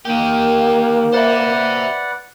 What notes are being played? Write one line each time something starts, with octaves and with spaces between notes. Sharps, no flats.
D#3 A#3 G4 A#4
B4 C5 D5 E5 F#5